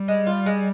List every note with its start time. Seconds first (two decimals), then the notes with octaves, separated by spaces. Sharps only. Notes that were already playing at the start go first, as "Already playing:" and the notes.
Already playing: G3
0.08 G#3
0.27 F4
0.46 G#3